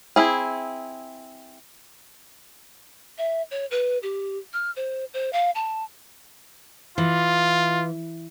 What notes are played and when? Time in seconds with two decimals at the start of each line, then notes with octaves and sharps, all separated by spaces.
0.16 C4 E4 G#4
3.18 E5
3.51 C#5
3.71 B4
4.03 G4
4.53 F6
4.76 C5
5.14 C5
5.33 F5
5.55 A5
6.98 E3 F4